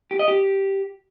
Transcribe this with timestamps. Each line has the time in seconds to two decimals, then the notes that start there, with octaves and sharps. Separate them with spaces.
0.11 G4
0.19 D#5
0.28 G4